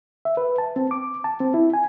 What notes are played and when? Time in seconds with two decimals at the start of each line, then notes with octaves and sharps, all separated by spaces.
0.25 E5
0.37 B4
0.58 A5
0.76 C4
0.91 D6
1.24 A5
1.40 C4
1.54 E4
1.74 G#5